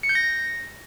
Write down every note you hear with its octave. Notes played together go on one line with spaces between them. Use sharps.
C#7
G6
A#6